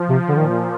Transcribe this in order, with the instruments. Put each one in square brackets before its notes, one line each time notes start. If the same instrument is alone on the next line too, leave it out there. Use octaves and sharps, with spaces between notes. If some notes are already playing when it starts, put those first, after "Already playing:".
Already playing: [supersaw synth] F3
[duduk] C3
D3
[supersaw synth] A#2 [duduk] D#3